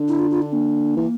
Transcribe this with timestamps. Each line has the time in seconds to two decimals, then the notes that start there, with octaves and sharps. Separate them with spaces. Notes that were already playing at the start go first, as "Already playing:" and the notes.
Already playing: D3
0.08 E4
0.19 F4
0.30 F4
0.42 D4
0.53 A#3
0.97 E3